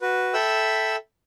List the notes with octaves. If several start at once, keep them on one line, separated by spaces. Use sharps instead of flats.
F#4 B4
A4 E5 G5 B5 E6